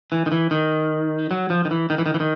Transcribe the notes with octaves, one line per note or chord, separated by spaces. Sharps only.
E3
D#3
E3
D#3
F#3
F3
D#3
E3
D#3
E3
D#3
E3
D#3